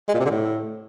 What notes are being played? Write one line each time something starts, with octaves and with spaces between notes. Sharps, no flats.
G#3
A#2
C3
D3
A2